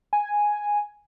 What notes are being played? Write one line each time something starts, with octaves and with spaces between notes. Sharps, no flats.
G#5